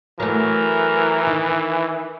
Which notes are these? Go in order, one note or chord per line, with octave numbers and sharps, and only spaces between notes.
E3 F#3 A3 A#4
D#3